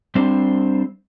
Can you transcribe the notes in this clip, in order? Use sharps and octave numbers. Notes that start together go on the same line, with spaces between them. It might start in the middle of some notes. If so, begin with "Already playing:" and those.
G3 C4 D4 C5